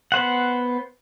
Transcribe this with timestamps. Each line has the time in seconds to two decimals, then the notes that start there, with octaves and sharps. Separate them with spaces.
0.12 B3 C5 F#5